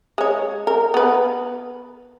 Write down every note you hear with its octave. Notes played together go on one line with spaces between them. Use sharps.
G#3 C#5
A#4
B3 B4